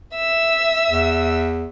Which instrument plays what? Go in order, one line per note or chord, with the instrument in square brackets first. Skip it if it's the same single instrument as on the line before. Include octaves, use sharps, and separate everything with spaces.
[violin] E5 E6
[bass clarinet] E2